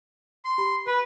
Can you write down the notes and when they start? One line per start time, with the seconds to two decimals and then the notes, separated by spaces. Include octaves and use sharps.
0.45 C6
0.58 G4 B5
0.87 B4 B5